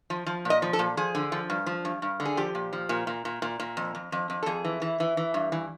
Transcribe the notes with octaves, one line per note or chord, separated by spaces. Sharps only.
F3
F3
A#2
D#5
F3
A4
A#2
F3 G#4
D3
F3
G2
F3
G2
G2
D3
G#4
F3 G4
A#2
F3
A#2
A#2
A#2
A#2
A#2
F2
F2
F2
F2
A4
F2 G#4
E3
E3
E3
E3
G2
E3